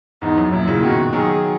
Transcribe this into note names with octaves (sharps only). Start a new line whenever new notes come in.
E2 G#2 D#4
F#2
F#2 A#2 E4
A#2 C#3
B2 D#3 F#4
D#3 F#3 G#4